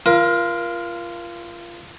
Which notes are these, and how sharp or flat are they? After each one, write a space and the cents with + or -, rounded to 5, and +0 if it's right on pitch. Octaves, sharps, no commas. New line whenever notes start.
F4 -20 A#4 +25